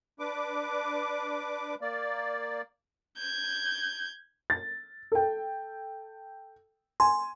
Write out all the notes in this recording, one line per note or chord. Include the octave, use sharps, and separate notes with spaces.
D4 B4 D6
A#3 D5
G6 G#6
A6
A4 G5
G#5 C6